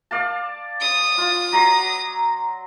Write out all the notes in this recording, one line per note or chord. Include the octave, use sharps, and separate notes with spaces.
D5 F5 A5
D#6
F4
F#3 A#5 C6